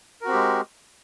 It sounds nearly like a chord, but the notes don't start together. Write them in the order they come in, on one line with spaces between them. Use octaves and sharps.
A#4 F#4 C4 G4 G#3